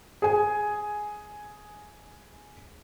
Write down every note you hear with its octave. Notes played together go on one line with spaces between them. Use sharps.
G#4 G#5